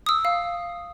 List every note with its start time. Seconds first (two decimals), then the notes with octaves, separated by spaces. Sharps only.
0.06 D#6 E6
0.25 F5